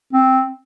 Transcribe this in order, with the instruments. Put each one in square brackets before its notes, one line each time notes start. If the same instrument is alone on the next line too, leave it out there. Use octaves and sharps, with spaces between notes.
[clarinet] C4